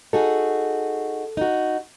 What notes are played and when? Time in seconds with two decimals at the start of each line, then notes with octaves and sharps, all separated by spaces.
0.13 D#4 F#4 G#4 A4
1.37 D#4 F#4